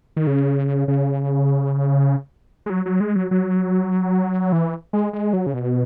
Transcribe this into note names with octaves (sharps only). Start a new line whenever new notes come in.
D#3
C#3
C#3
G#3
F#3
F#3
G#3
F#3
F#3
E3
G#3
G#3
F#3
C#3
B2